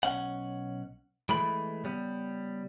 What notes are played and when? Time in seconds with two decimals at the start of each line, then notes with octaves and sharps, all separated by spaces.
0.03 B1 C#4 F#5
1.29 E3 G#3 A3 B5
1.84 C#3 G3 B3